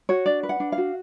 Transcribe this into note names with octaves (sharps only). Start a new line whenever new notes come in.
F#4 C#5
D4 D5
B4
F#5
D4
F5
F#4